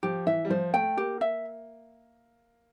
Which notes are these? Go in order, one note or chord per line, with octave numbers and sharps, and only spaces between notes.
F3 G4
E3 E5
G3
F3 C5
A3 G5
A#3 G4
E5